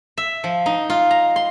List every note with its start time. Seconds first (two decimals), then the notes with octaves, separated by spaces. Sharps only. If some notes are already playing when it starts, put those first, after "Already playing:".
0.17 E5
0.44 F3
0.66 D#4
0.90 F4
1.11 A#5
1.36 C6